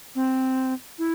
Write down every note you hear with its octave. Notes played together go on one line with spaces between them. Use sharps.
C4
E4